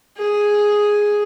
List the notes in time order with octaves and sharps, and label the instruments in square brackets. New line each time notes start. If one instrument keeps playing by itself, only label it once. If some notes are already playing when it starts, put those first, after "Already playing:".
[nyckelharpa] G#4